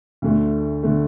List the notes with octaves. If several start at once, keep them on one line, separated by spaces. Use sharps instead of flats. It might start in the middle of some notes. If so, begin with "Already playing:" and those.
D2 D3 A3
D3 A3